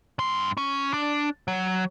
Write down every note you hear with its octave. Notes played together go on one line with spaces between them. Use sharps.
G2 C6
C#4
D4
F#3